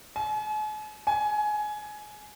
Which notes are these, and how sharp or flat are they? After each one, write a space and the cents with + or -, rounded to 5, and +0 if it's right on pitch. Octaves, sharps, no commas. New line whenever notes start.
G#5 +45
G#5 +20